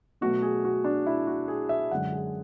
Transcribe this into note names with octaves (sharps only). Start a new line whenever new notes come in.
B2 F#3 A3 F#4
G#4
F#4
D4
E4
F#4
G#4
E5
F#2 D3 G#3 F#5
G#4